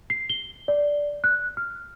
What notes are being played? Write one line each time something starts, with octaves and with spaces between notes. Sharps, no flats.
C7
G7
D5
F#6
F6